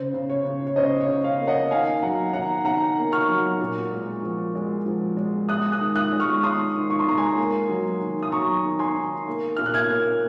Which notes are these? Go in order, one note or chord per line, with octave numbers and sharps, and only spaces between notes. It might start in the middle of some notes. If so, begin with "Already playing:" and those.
Already playing: C#3 C5
C#3
C#5
C#3
C#5
C#3 C5 D#5
C#5
C#3
C#5 F5
A#3
D#5 F#5
D#3 F5 G#5
F#3 F#5 A#5
D#3 F#5 A#5
D#3 F#5 A#5
A#3
C#6 F6
F#3
A#2
G#3
F3
G#3
F3
G#3
G#3 D#6 F#6
D#6 F#6
D#3
D#6 F#6
G#3
C#6 F6
D#3 C6 D#6
D#3
C#6
C6
G#3 A#5
G#5 C6
A#3
F#3
D#3
D#6
F#3 A#5 C#6
D#3
G#5 C6
D#3
A#3
A#2 F6
F#6
F6 G#6
A#3